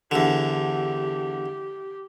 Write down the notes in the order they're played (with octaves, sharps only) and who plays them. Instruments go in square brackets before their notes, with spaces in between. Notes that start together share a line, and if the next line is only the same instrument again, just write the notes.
[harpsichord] E2 D3 [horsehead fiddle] G4